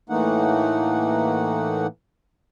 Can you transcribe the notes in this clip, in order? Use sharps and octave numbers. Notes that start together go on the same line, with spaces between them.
A2 E3 A3 A#3 D#4 F#5